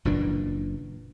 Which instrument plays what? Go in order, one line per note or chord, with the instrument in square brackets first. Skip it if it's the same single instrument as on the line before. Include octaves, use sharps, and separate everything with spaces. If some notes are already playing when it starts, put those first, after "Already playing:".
[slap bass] F#1 A#2 E3 D4